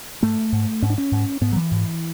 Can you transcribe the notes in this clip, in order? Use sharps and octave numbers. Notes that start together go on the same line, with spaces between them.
G#2 A3
G#2
G#2 C#4
D4
C#4
G#2
G#2 B3
F#3
E3
G#2